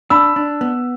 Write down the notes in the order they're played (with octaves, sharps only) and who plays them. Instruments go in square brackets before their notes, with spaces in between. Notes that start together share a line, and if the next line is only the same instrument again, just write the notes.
[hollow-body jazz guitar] D4 [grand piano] B5 E6
[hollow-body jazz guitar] D4
B3